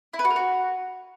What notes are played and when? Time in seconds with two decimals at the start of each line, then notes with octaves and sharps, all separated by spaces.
0.13 E4
0.19 B4
0.25 F#4
0.30 A#4
0.36 F#4